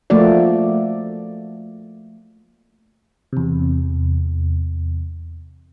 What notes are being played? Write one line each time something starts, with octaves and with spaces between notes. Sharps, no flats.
F3 A3 A#3 F#4 D5
E2 C3